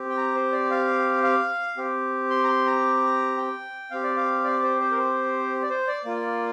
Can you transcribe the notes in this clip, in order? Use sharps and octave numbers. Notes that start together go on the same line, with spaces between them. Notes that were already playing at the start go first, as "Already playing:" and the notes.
Already playing: C4 G4
G5
A#5
C5
D5
F5
F5
C4 G4
C6
A#5
C6
A#5
G5
C4 G4 F5
D5
F5
D5
C5
C5
A#4
C5
D5
C5
D5
A#3 F4